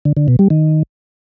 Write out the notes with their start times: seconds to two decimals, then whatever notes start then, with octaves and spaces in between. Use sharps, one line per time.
0.05 D3
0.17 D3
0.28 B2
0.39 G3
0.50 D#3